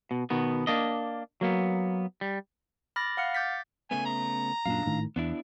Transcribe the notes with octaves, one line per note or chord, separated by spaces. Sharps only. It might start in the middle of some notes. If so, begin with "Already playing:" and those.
B2
B2 D#3 B3
A#3 D4 D#5
F#3 A#3 B3
G3
B5 D6 F6 A6 A#6
F5 F#5 F6 C#7
D6 G6 A6 B6
C#3 A3 B3 G#5
A#5
F#2 A#2 D4 F5
G#1 A2 D#3
E2 B3 D4 E4